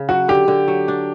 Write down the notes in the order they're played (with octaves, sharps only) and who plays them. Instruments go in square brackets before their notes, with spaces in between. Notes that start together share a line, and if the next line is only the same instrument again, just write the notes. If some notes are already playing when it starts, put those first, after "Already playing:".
Already playing: [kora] C#3
[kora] F#3 [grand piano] F#4
[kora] D3 [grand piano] G4
[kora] D3
F#3
D4